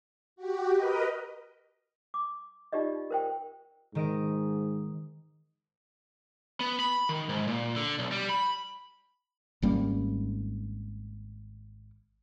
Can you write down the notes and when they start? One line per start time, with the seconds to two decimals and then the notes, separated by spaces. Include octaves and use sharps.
0.36 F#4 G4
0.73 A#4 B4 D#5
2.14 D6
2.73 D#4 F4 G4 D5 D#5
3.10 A#4 C5 G5
3.95 G#2 D#3 D#5 D7
6.60 B3
6.80 B5
7.09 D#3
7.29 G#2
7.48 A#2
7.76 D3
7.99 B1
8.12 G3
8.30 B5
9.62 G#1 G3 A#3 C#4